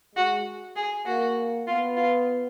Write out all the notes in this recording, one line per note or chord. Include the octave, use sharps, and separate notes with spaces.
G#3 F#4
G#4
A#3 F#4
B3 F4
F4